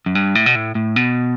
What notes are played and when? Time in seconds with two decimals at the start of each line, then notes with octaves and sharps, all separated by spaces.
0.06 F#2
0.15 G2
0.35 A2
0.46 B2
0.55 A2
0.75 A2
0.96 B2